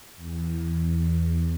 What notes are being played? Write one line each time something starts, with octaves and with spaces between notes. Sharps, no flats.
E2